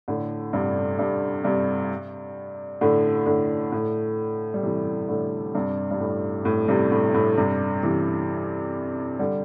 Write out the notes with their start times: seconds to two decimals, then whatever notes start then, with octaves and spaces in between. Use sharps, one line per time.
0.08 A2 D3
0.53 G2 C3
0.99 G2
1.44 G2 C3
2.81 A2 D3
3.26 A2 D3
3.72 A2
4.54 G3
4.63 C3 E3
5.09 A2 D3
5.55 G2 C3
5.91 G2
6.00 A2
6.45 A2
6.68 G2 C3
6.92 A2
7.14 A2
7.38 G2 C3
7.83 C3 E3
9.19 D3 G3